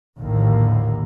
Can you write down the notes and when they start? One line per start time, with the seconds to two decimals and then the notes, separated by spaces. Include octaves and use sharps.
0.17 A#1 D#2 A2 D3 A#3